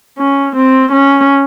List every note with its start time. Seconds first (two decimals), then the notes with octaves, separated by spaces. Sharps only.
0.19 C#4
0.56 C4
0.92 C#4